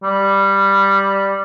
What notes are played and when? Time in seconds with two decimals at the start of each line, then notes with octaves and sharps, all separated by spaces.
0.04 G3